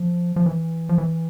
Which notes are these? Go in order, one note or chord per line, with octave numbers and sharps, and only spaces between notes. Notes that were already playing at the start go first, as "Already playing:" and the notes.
Already playing: F3
F3
E3
F3
E3